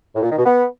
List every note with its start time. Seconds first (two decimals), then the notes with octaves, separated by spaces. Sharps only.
0.15 A2
0.22 A#2
0.30 D#3
0.37 B2
0.45 B3